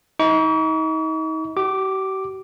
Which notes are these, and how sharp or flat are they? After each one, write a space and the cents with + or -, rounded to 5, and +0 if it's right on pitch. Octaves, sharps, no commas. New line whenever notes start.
D#4 +35 C#6 +45
G4 -45 D6 +0